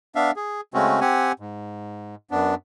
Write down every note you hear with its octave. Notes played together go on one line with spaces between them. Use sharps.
B3 D4 E5 F5
G#4
C#3 G#3 A3 C4 C#4 F#4
C4 G4 F#5 G#5
G#2
F#2 B3 D4